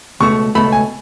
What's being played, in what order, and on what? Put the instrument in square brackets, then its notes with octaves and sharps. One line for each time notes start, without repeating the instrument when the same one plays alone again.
[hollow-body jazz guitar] C#2 B2 A3 [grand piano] C#6
[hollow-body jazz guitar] C#2 B2 A3 [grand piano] B5
[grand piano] G#5